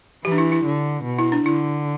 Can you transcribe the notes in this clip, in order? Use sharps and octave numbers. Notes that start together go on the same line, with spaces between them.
E3 G4
D4
E4
E4
D3
B2
E4
D4
D3 E4